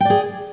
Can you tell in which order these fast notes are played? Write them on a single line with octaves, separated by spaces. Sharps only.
G5 D5 G#4